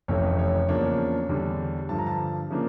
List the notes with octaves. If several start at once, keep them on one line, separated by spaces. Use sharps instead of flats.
F1 F2 E3 A3 C#4 C#5
C#5
E2 C#3 F3 A#3 D4 C#5
E2 D3 G3 D4
G2 D3 F3 A5
A#5
A5
C#3 F3 A#3 D4